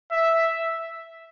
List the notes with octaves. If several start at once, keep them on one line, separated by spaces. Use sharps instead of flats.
E5